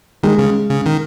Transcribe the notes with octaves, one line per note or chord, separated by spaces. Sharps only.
D#3 G#3
C#3
C#3
D#3